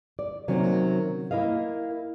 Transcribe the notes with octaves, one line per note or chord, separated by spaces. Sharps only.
D5
C3 D#3 F#3 A#3 C#4
A#3 E4 A#4 D#5 F5